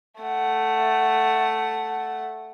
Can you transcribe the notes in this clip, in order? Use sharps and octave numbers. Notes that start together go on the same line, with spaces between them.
A3 F#5